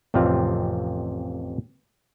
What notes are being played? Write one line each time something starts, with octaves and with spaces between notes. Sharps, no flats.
A1 F2 C3 C4 F4 F5